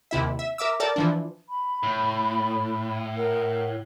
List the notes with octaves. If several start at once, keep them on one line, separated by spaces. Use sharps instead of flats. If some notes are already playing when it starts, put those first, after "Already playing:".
D#2 C3 E4 E5
E5
A#4 E5 D6 E6
A4 A#4 D5 G5 A5
E3 F3 D4
B5
A2
A#4 F#5